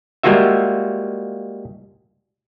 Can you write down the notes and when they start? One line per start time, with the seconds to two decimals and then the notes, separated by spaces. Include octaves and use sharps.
0.23 G3 G#3 A#3 F4 F#4 E5